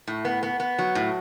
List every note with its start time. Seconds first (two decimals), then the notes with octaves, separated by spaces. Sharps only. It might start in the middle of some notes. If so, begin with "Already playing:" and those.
0.08 A2
0.25 B3
0.43 B3
0.60 B3
0.79 F#3
0.95 A2